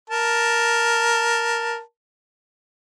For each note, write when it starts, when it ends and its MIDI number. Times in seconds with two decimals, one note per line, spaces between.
0.10 1.80 70
0.10 1.80 81